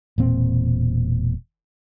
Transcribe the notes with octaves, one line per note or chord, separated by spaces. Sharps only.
E1 A#2 C4